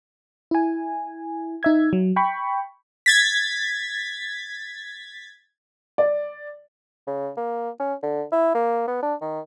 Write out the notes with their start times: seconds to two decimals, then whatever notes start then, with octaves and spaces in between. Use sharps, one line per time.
0.51 E4 G#5
1.63 D#4 E5 G#6
1.93 F#3
2.16 G5 B5 C#6
3.06 G#6 A6 B6
5.98 D5
7.07 C#3
7.37 A#3
7.80 C#4
8.03 D3
8.32 E4
8.55 A#3
8.88 B3
9.02 D4
9.21 D#3